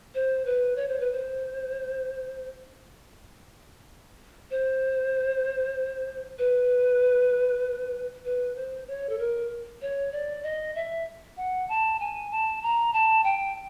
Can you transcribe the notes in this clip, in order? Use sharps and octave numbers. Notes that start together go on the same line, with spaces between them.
C5
B4
C#5
C5
B4
C5
C5
B4
B4
C5
C#5
A4
A#4
C#5
D5
D#5
E5
F#5
A5
G#5
A5
A#5
A5
G5